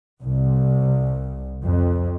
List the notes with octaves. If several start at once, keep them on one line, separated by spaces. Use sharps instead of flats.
C2
F2